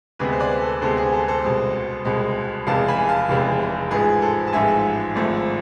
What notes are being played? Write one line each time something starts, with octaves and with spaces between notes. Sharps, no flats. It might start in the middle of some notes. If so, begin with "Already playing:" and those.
D2 C3 G#3 B3 G#4 B4
C5
B4 D5
A4
D2 C3 G#3 B3 A4 C5
G#4
A4
A4 C5
C2 B2 G#3 C4
C2 B2 G#3 C4
F1 E2 C3 G#3 F5 A5
G#5 B5
F5 A5
F1 E2 C3 G#3
A1 G#2 F3 G#3 G#4 B4
A4 C5
A5
A1 G#2 F3 G#3 E5 G#5
G#1 G#2 F3 A3 C4